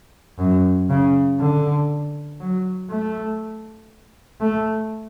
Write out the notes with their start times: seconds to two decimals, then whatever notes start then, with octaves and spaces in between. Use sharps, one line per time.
0.39 F#2
0.90 C#3
1.40 D3
2.40 F#3
2.90 A3
4.41 A3